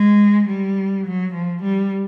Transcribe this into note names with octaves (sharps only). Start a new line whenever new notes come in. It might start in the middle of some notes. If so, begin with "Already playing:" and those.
Already playing: G#3
G3
F#3
F3
G3